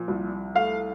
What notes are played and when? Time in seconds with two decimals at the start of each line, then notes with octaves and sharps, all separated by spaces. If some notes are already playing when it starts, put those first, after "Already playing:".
Already playing: A#2 F3
0.08 C2
0.55 A3 F5